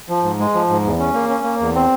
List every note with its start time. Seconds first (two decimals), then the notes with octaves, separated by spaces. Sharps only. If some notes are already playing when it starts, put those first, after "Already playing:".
0.09 F3
0.23 G#2
0.39 G#3
0.54 F3
0.69 G#2
0.84 E2
0.99 C#4
1.14 A#3
1.29 C#4
1.44 A#3
1.60 E2
1.75 C4